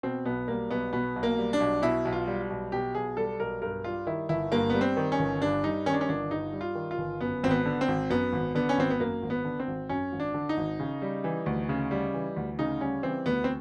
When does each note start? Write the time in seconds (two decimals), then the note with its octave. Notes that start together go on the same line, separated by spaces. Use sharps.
0.03 B2 C4
0.25 B1 B3
0.48 G3 A#3
0.71 B1 B3
0.93 B2 B3
1.16 B1
1.23 A#3
1.38 G3
1.53 D4
1.60 B1
1.82 B2 E4
2.05 B1
2.12 F4
2.27 G3
2.50 B1
2.72 B2 G4
2.95 B1 G#4
3.17 G3 A4
3.40 B1 A#4
3.62 G2 A#4
3.84 G3 F4
4.07 D#3 E4
4.29 G1 E4
4.52 G2 A#3
4.70 G3 B3
4.81 C4
4.97 D#3
5.12 C#4
5.19 G1
5.41 G2 D4
5.64 G3 D#4
5.86 D#3 C#4
5.94 D4
6.01 C#4
6.09 G1 D4
6.31 G2 D#4
6.53 G3
6.61 F4
6.75 D#3
6.91 F4
6.98 G1
7.20 F#2 B3
7.43 G#1 C4
7.51 B3
7.66 D3
7.81 C4
7.88 G#1
8.10 F#2 B3
8.33 G#1
8.55 D3 B3
8.69 C#4
8.78 G#1 C4
8.90 B3
9.00 F#2 A#3
9.22 G#1
9.30 B3
9.45 D3
9.60 C4
9.67 G#1
9.89 F#2 C#4
10.12 G#1
10.20 D4
10.34 D3
10.49 D#4
10.57 G#1
10.80 C#3
11.02 G3
11.24 E3
11.46 D2
11.69 C#3
11.91 G3
12.14 E3
12.36 D2
12.59 C#3 D#4
12.81 G3 C#4
13.03 E3 C4
13.26 D2 B3
13.44 C4